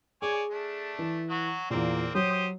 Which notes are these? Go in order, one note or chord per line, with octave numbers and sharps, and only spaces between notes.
G#4 C#5 D5 G#5
A3 D4
E3
F#3 F#4
E2 A#2 A#3 C4
F#3 G4 C5 D#6